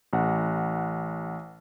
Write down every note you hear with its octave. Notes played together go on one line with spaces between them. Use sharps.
A1 F#5